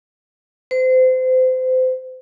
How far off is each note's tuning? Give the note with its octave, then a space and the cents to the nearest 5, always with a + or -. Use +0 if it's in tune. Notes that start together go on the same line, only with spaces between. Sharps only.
C5 -30